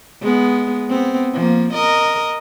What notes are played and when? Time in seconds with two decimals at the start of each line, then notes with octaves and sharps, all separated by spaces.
0.22 G#3 B3
0.89 B3 C4
1.34 F3 A#3
1.73 A#4 D#5